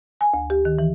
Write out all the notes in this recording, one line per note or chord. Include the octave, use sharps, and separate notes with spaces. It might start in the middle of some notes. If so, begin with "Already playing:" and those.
G#5
D2
G4
D#3
E3